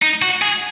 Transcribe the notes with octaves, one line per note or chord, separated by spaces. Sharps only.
D#4
F#4
G#4